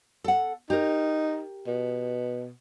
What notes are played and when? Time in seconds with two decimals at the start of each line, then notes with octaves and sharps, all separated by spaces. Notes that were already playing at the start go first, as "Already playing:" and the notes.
0.24 A4 F#5
0.70 D#4 G4 A#4
1.67 B2